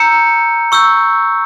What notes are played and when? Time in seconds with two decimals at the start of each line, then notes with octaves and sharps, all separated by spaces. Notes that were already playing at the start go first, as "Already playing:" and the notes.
Already playing: A#5 E6 G6 C#7
0.72 C#6 E6 G6